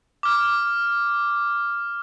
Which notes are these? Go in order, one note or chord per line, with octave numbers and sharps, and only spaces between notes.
D6 F6